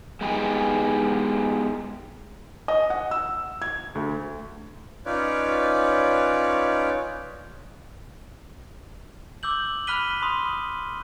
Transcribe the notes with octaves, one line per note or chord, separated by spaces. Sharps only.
G#3 B3 D#4 G4 G#5
D#5
F#5
E6
G#6
D2
C#4 D#4 F4 B4 C#5 D5
D6 E6 G6 F#7
B5 F6 F#6 B6 D#7 G7
B5 C6 D#6